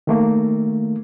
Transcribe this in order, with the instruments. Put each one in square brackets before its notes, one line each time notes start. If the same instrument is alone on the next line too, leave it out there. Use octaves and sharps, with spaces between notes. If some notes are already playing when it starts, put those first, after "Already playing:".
[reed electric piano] D#3 A3 A#3